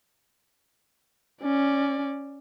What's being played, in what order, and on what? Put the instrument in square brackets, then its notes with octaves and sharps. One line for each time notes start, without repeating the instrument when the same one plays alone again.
[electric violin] C#4 D5